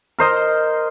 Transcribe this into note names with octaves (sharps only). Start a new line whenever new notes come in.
A#4 C5 D#5